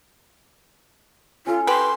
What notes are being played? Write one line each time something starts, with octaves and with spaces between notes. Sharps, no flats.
C#4 F4 A4
G4 B4 C6